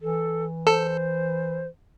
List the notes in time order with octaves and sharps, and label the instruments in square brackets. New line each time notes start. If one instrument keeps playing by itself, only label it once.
[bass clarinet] E3 [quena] A4
[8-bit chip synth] A4 [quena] C5